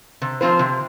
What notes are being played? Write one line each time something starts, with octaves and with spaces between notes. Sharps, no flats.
C3
F3 C4 F4 C5
C3